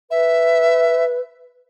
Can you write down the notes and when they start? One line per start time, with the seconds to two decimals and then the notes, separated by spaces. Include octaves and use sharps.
0.11 B4 E5